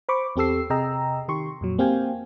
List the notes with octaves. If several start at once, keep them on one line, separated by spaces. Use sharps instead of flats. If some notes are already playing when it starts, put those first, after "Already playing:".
C5 B5 C#6 D6
E2 C4 G4 A4 E6 C7
C3 G#4 D#5 G5 A#5 E6
D#3 G4 C6 C#6
F2 A#2 F#3
A#3 C4 G4 F5 G5 G#5